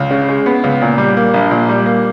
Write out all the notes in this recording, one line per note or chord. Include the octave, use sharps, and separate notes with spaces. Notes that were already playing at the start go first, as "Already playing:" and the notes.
Already playing: C#2
C#3
G#3
B3
C#2
A#2
G3
A#3
A#1
A#2
G3
A#3